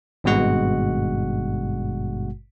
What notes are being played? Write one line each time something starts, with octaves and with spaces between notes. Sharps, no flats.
G#1 G2 B2 G#3 F#4 F#5